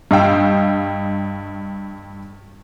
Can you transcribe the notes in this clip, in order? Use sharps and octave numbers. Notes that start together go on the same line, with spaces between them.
G2 D#5 F5 G5 E6